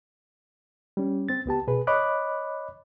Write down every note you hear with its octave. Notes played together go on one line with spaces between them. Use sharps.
G3 C#4
C4 A6
C#2 B3 G4 A5
B2 G#4 B4
C#5 D#5 B5 D6 F#6